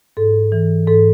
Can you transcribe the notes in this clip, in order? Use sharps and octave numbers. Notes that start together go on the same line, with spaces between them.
G#2 A4
E3
G#2 A4